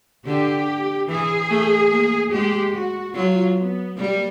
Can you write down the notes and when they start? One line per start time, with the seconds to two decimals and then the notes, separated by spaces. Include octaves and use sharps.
0.26 D3 G4
1.08 E3 G#4
1.51 A3
1.91 A#3
2.33 G#3 G4
2.75 F#4
3.15 F#3 F4
3.57 B3
3.98 G3 A#3